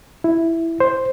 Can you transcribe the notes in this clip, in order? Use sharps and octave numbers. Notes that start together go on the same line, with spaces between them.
E4
C5